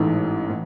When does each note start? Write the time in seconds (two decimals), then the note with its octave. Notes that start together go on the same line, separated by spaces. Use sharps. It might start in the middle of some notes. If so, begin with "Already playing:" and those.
Already playing: A1 G#2 E3 A3
0.49 A2 E3